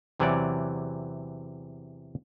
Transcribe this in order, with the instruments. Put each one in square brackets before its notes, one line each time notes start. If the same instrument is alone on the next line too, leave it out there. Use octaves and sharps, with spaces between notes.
[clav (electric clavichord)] E2 C3 E3 F#3 C#5 D5